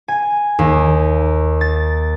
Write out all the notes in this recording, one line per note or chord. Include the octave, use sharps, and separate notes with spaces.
G#5
D#2
A6